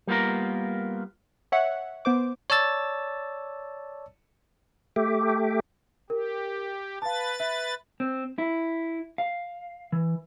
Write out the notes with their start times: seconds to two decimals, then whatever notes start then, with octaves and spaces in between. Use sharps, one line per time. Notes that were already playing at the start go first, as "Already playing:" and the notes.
0.07 G3 A#3 B3 F4 A#4
1.52 C#5 E5 F#5
2.05 B3 C5 D6
2.50 C#5 D5 A5 E6 A6
4.96 A3 G4
6.10 G4 A#4
7.02 B4 F5 A5 A6
7.40 E5
8.00 C4
8.38 E4
9.18 F5
9.92 E3